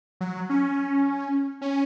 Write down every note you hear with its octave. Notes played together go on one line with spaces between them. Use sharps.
F#3
C#4
C#4